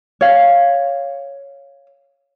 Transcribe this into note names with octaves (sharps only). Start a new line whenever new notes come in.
C#5 F5